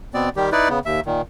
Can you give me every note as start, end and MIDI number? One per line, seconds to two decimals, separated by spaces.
0.14 0.29 47
0.14 0.29 59
0.14 0.29 60
0.14 0.29 74
0.36 0.50 51
0.36 0.50 55
0.36 0.50 67
0.52 0.68 63
0.52 0.68 64
0.52 0.68 71
0.52 0.68 74
0.69 0.79 49
0.69 0.79 59
0.86 1.00 39
0.86 1.00 76
1.06 1.22 46
1.06 1.22 51